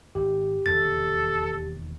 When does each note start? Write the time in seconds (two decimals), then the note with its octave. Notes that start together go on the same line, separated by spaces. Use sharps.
0.15 G#1 G4
0.66 E1 D#2 D3 A4 A6